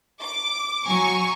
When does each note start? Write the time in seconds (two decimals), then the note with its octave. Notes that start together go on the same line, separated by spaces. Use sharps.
0.22 D6
0.86 F#3 G#5 A#5 C#6